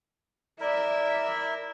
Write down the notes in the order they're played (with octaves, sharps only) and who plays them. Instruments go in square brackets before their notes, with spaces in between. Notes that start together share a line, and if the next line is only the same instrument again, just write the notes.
[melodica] E4 A#4 [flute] D5 [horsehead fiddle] E5